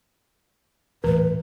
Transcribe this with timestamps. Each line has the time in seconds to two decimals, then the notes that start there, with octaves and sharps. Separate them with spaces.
1.04 D#1 A2 E3 B4